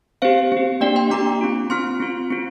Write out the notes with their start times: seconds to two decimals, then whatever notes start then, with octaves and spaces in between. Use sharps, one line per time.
0.22 C4 G4 C5 F5
0.52 C4 G4
0.81 A#3 D4 G4 D5 G5
0.96 G5 C6
1.11 A#3 D4 G4 A#5 D6
1.41 C4 F4
1.70 C4 F4 C6 F6
2.00 C4 F4
2.31 C4 F4